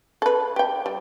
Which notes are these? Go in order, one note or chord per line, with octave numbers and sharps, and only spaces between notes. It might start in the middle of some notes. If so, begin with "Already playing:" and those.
A4 B4
G4 G5
G3